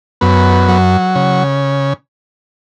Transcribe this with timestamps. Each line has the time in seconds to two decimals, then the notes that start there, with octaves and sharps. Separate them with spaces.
0.21 F#2 B3
0.68 F#3
1.15 C#3